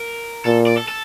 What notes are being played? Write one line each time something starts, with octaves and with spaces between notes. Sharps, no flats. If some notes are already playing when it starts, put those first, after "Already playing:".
Already playing: A#4
A#2 A4
D5
A4
A4